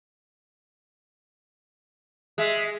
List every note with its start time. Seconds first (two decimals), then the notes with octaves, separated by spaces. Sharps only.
2.38 G#3 E5